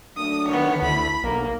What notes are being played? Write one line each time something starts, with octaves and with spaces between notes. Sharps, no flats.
F#3 A3 D4 D#6
D#3 B3 C#5
D2 A3 E4 B5
B1 D3 A#3 A#5